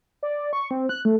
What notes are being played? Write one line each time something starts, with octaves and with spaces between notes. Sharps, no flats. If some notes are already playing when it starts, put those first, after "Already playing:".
D5
C#6
C4
F#6
A3